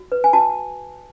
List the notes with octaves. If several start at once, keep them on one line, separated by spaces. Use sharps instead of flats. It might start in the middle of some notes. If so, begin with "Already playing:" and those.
Already playing: F#4
B4
G#5
F#4 A5